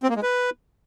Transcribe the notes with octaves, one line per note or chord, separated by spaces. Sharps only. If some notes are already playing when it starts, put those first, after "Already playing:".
C4
A#3
G#3
B4